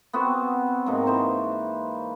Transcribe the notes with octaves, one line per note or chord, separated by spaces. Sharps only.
B3 C4 F#4
G#2 C3 A#3 D#4
E3 C5 C#6